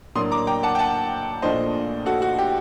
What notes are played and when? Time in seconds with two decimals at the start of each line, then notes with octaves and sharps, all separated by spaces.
0.15 A2 F#3 A#3 D4 C6 D#6
0.31 A#5 D6
0.47 G5 A#5
0.63 F#5 A5
0.75 G5
0.78 F#5 A5
1.42 A#1 A#2 A3 D4 C5 D#5
2.06 F#4 A4
2.22 F#4
2.39 G4